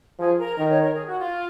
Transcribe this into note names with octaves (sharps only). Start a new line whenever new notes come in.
F3 G#4
A#4
D#3 A#4
C#5
A#4
G#4
F#4
F4